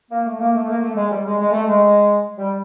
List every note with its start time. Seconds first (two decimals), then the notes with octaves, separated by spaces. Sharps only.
0.11 A#3
0.26 A3
0.39 A#3
0.54 A3
0.67 A#3
0.82 A3
0.96 G#3
1.10 G3
1.24 G#3
1.38 G#3
1.52 A3
1.67 G#3
2.37 G3